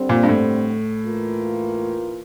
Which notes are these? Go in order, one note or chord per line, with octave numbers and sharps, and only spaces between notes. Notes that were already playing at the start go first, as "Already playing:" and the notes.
Already playing: D3 G3 C4
A#2
G2
A2
E3 A#3 F4